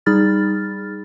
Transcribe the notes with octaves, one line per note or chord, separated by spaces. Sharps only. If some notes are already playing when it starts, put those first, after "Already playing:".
G3 D#4 G#4 B5 F6 A6